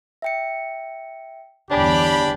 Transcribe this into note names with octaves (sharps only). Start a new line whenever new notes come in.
E5 G5 C#7
G1 E2 D4 G4 C#5 D5 G#5 B5